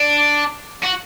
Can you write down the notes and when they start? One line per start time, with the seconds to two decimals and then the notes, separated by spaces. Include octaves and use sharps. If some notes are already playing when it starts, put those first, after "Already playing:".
Already playing: D4
0.84 F#4